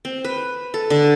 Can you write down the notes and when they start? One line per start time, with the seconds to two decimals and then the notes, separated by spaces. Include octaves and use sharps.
0.05 C4
0.25 B4
0.74 A4
0.90 D3